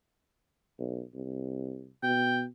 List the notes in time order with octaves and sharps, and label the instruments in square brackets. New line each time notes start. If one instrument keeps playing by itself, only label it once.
[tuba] B1
C2
[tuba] B2 [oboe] G5